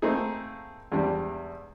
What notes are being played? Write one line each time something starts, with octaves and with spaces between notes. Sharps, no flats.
A3 A#3 C4 D#4 G#4
E2 G#2 G3 D4